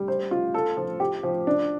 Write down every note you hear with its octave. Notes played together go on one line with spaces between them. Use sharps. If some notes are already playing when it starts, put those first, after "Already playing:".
Already playing: G3
C5
F4
A4
F3
G4
F3
D4